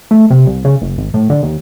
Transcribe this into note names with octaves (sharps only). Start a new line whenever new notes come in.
A3
C3
C2
C#3
F#1
G#1
A2
D3
D#2